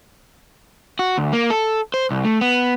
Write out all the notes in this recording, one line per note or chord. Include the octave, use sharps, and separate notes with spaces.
F#4
D2
A#3
A4
C5
C2
A3
B3